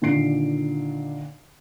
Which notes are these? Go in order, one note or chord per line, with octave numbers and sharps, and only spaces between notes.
A#2 D3 D#3 C7 D7